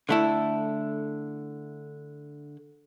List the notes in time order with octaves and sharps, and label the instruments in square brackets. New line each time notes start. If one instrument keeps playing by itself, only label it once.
[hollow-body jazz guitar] D3 A3 E4